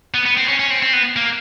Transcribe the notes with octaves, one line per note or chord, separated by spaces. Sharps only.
B3
B3
C4
C#4
C#4
C4
C4
B3
A#3